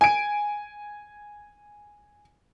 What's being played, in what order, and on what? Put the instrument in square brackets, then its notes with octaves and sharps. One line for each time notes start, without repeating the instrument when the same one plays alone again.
[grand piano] G#5 D7